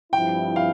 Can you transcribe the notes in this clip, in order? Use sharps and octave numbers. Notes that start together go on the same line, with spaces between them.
G2 F3 C4 E4 G5
F5